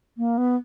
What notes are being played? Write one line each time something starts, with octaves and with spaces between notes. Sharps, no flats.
A#3
B3